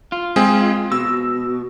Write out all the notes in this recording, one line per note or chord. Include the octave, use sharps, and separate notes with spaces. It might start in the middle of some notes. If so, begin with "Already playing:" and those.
F4
G#3 C4 G#4
B2 E6